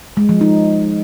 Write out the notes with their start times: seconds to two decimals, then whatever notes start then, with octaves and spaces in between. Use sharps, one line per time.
0.17 G#3
0.29 F3
0.41 D#4